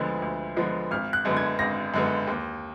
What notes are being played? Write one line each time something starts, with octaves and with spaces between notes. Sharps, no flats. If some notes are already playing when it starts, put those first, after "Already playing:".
Already playing: D2 D3 F3 G#3 B3
D2
D3 F3 G#3 B3
G#1 F6
F#6
F#2 D3 G#3 B3
G#6
G#1 A#6
F#2 D3 G#3 B3
D#2